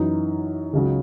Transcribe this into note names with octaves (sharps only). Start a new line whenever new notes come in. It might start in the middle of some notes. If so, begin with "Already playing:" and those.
Already playing: F#2 E3 D#4
C#2 C#3 F#3